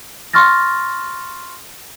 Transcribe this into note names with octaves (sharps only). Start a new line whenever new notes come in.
C6 C#6 F6 A6 A#6